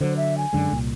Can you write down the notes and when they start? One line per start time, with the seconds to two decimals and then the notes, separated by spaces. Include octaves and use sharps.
0.01 D3 F#3 C5
0.17 E5
0.37 G#5
0.53 F#2 D3 G#3
0.72 C2 A#2